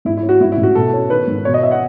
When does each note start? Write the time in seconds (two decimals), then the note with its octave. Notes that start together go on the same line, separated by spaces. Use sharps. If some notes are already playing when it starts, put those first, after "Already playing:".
0.05 G#2 E4
0.17 E4
0.23 C#4
0.29 F#4
0.40 G#2 E4
0.52 E4
0.57 A1
0.63 F#4
0.75 B2 A4
0.93 C#4
1.10 D#3 B4
1.27 G#2
1.45 B2 C#5
1.54 D#5
1.63 E5
1.71 F#5